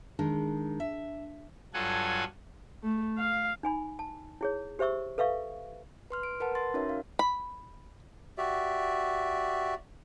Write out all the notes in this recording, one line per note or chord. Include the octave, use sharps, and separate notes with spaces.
D#3 G#3 D4
E5
G2 F#3 F4 A4 F#5 G#5
A3
F5
D#4 G#5 B5
A5
E4 G#4 C#5
G4 C5 E5 C#6 E6
A4 B4 E5 F5 C#6
B4 C6 F6
D7
A#4 B4 F#5 A5
C6 A6
C#4 D#4 F#4 A#4 C#5 E5
F5
B5
F#4 G4 D5 E5